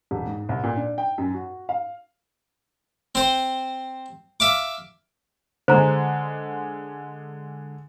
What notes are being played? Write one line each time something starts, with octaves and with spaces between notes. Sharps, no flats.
E1
G#2
C2
A#2
D4
G5
F#2
F#4
F5
C4 C5
E5 F5 D6
D3 G#3 C5 A#5